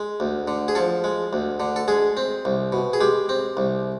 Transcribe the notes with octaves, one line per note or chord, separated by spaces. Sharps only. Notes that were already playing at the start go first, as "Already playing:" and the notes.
Already playing: G#3
D2
D3
G#4
F3 A4
G#3
D2
D3
A4
G#3 G#4
C4
C2
B2
G#4
G#3 G4
C4
C2